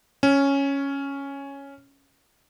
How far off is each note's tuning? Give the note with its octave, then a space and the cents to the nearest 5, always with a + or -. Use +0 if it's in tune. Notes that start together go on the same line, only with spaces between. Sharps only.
C#4 +0